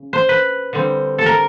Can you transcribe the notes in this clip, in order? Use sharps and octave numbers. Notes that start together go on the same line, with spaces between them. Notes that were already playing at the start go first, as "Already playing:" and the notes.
Already playing: C#3
C5
B4
D3 G3 C4
A4
A#4